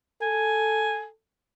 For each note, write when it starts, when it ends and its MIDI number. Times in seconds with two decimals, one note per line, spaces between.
0.21 1.13 69
0.21 1.05 80